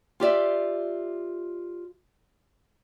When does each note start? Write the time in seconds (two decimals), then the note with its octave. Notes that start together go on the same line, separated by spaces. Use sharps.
0.20 F4 G4 D5 E5